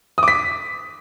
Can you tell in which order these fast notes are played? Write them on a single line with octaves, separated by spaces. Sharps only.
D#6 D6 B6